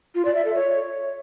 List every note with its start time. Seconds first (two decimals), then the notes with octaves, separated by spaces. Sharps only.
0.15 F4
0.25 D5
0.35 E5
0.45 A4
0.55 C#5